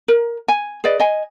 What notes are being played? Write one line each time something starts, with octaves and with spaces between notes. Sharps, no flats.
A#4
G#5
G#4 B4 D5 D#5
D#5 G#5